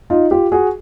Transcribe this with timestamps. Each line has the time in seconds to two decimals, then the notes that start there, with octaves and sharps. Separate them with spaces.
0.10 D#4 F4
0.31 F4 G4
0.52 F#4 G#4